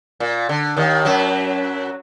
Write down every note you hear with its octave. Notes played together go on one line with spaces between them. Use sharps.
A#2
D3
D#2 D#3
F#2 F#3